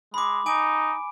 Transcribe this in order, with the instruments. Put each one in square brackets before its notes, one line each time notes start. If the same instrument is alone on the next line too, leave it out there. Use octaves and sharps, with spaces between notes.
[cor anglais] G#3 [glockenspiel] B5 D6
[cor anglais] D#4 [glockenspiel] G#5 D6 D7